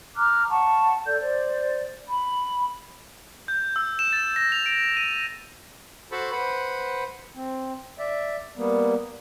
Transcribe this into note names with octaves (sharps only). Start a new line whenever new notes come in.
A#5 D6 F6 F#6
F#5 A5 C#6
A4 D5 G6
C5 D5
B5
G6
E6
E7
A6
A#6
F7
D7
D#7
F#4 A4 C5 A5 B5 C#6
B4 C5 F#5 B5
C4
D5 E5
G3 A#3 B3